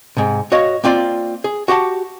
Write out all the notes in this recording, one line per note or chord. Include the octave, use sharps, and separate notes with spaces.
G#2 C3
F#4 C#5 D#5 F5
A#3 C4 F4 D5 F5
G#4
F#4 G4 F#5 A5